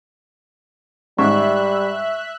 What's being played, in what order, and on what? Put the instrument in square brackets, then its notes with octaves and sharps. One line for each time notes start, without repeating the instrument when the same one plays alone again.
[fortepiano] G#2 [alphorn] G3 [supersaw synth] E5 F#6 [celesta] C#6